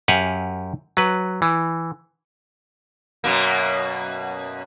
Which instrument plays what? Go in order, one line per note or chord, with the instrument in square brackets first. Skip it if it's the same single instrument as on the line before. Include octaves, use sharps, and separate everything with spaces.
[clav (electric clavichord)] F#2 G4 F5 F#5 G#5
F#3 B4
E3
[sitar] F#2 B2 A#3